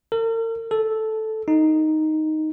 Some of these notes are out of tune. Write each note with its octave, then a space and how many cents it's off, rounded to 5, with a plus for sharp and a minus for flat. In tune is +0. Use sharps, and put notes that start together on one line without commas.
A#4 -45
A4 -5
D#4 +0